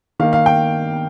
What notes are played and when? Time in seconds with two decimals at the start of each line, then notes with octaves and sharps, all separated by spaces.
0.19 D#3 A#3 F5
0.33 F5
0.46 G5